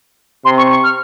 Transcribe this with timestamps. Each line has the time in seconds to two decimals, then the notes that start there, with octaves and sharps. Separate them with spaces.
0.45 C3 C6
0.57 C#6
0.70 C#6
0.83 F6